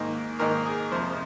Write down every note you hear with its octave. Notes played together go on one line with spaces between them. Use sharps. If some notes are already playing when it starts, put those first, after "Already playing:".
Already playing: G#2 D#3 A#3 D#4
G#2 D#3 A#3 D#4 A#4
G#4
F2 C3 F3 C5